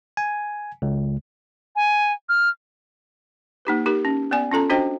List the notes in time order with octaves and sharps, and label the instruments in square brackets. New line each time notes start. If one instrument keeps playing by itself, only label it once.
[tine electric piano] G#5
C#2
[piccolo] G#5
F6
[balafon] A#3 D#4 G4 B4
D#4 G4 A#4
C#4
B3 D5 G#5
C#4 F4 A4 A#5
D4 F#4 C5 D#5 G5